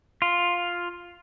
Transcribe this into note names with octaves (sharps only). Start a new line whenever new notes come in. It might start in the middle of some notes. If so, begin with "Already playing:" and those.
F4